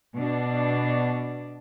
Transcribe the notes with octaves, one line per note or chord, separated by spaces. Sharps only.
B2 D4